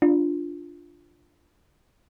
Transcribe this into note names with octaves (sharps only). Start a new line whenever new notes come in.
D4 F4